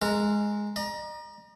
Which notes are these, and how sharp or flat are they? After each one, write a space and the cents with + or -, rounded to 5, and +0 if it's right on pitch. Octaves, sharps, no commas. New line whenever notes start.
G#3 +0 A#4 -40 A#5 +0
D#5 -40 A#5 +25